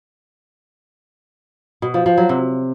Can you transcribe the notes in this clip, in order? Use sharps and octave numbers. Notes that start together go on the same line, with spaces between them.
B2
F3
F3
F#3
C3